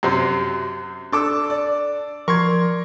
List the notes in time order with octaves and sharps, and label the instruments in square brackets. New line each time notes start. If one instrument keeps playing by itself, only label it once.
[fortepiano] F#2 C3 C5
[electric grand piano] D4 [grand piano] A4 D6 E6
[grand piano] D5
[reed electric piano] F3 [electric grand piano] A#4 C6 G#6 [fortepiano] C#6